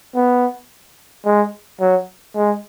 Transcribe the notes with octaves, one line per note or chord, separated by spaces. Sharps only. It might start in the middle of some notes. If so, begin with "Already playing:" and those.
B3
G#3
F#3
G#3